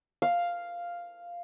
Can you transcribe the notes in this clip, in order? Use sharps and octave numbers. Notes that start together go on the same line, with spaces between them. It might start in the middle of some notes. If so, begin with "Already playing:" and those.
F5